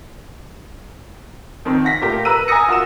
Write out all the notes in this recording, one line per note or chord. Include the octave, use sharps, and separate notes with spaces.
F2 D#3 C4
F#5 A#6 B6
A#2 A3 G4 A#4
A#4 B4 A#5 E6 D#7
G#5 A#5 D#6 A#6 C#7
F4 F#4 A#4 E6 E7